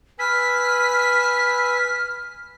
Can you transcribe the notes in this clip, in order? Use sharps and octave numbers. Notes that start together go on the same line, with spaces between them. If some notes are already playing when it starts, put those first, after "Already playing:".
B4 G#5 E6 F6 B6